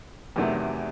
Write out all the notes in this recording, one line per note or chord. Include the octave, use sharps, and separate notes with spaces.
E2 C3 D#3 F#3 A3